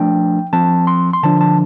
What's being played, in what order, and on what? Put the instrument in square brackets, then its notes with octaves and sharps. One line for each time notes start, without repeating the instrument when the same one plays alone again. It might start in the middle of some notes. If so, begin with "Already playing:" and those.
Already playing: [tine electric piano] F3 A3 D4 G5
F3 C4 A5
C6
C6
D3 F3 D4 A5
A5